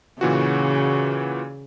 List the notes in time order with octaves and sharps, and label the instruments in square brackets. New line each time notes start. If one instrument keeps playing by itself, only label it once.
[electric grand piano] A#2 E3 F#4 [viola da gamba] C#3